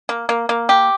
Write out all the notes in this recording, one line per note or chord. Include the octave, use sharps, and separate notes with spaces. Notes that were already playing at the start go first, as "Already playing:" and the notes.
A#3
A#3
A#3
G4